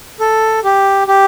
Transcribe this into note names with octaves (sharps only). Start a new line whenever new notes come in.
A4
G4
G4